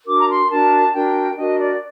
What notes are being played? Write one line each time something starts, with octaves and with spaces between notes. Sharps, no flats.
D4 F#4 A#4 D6
A#5
C6
D4 F#4 A#4 A5
D4 F#4 A#4 G5
D4 F#4 A#4 D#5
D5